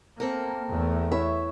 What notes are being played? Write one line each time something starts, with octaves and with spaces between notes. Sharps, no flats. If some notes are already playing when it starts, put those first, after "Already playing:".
A#3 C4 A4 A#4
E2 A3
E4 B4 C#5 E5